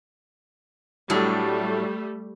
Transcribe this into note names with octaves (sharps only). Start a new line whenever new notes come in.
A2 F#3 G3 A3 D4